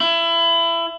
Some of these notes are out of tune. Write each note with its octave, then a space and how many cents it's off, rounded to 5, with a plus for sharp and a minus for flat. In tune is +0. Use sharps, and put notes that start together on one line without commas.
E4 +25